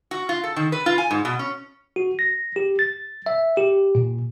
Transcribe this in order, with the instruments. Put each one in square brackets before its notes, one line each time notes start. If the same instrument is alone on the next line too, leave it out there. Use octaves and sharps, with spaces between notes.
[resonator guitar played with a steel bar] F#4
F4
A4
D#3
B4
F4
G#5
G#2
B2
C#4
[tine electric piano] F#4
A#6
G4
A6
E5
G4
A#2